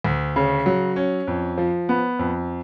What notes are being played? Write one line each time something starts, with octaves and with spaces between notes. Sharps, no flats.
D2
C#3
F#3
C#4
F2
F3
B3
F2